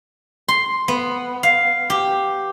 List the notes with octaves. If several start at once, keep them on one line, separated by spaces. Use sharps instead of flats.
C6
B3
F5
G4